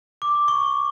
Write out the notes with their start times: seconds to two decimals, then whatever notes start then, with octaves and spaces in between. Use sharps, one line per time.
0.22 D6
0.48 C#6